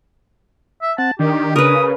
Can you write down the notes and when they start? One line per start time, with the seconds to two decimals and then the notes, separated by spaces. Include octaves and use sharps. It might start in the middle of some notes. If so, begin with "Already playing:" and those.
0.82 E5
0.98 C4 F#5 A5
1.19 D#3 D4 G4
1.56 C#3 A#4 B4 D#6